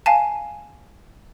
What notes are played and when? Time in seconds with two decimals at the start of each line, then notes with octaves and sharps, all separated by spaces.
0.06 F5 G#5 A5